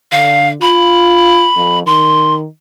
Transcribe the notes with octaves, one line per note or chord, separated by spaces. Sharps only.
D3 F5
F4 B5
F2
D#3 C6